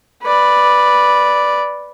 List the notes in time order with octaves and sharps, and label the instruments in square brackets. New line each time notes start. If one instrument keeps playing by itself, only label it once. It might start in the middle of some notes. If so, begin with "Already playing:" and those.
[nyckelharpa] B4 D5